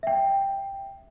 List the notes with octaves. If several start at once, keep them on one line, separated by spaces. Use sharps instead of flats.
E5 G5